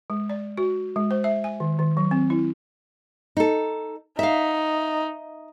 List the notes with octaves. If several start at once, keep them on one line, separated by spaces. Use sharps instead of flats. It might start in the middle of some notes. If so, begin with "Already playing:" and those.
G#3
D5
F#4
G#3
C5
E5
G#5
D#3
D#3
F#3
C4
E4
D#4 A4
D#4 E5 F5